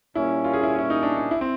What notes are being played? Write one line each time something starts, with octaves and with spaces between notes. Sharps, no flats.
A#2 G3 A#3 C#4 E4
F4
G#4
E4
E4
D#4
D4
D#4
E4
C4